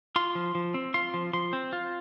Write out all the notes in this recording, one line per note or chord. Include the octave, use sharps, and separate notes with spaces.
F4 C6
F3
F3
C4
F4 C6
F3
F3 C6
C4
F4